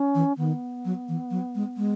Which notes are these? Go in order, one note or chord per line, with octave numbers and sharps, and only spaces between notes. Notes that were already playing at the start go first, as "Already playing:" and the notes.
Already playing: C#4
E3
D#3 B3
F#3
E3
F#3
G#3
G#3